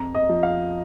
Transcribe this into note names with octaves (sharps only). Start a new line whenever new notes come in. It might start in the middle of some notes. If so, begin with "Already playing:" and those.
Already playing: F2 A#5
D#5
F3
F5